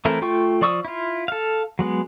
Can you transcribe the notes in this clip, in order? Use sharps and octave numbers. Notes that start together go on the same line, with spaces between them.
E3 A3 C4 E4 A#4
A3 F4 G5 C#6
F3 D5 C#6 D#6 E6
E4 F4
A4 F5
F#3 G#3 B3